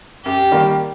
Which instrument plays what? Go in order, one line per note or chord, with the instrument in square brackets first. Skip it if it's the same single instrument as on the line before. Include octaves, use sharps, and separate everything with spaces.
[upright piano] F#2 [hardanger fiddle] G4
[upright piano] D#3 G3 A#3